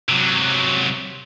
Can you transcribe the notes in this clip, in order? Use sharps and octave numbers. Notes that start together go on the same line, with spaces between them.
C3 F#3